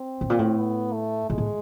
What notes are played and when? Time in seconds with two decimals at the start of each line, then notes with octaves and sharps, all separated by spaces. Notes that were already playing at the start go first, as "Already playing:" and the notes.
Already playing: C4
0.21 A2
0.30 A#2
0.39 A2
0.57 B3
0.93 A3
1.30 A#2 G#3
1.38 A2